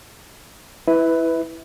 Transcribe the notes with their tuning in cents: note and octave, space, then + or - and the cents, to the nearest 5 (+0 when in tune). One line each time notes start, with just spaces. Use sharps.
E4 +0 B4 +10 E5 -25